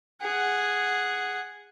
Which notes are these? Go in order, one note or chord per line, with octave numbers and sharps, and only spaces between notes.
G#4 F#5